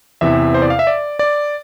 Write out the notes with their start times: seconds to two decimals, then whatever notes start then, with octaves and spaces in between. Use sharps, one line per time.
0.21 E2 C3 E3 E5
0.54 C5
0.62 D5
0.70 F5
0.79 E5
0.87 D5
1.19 D5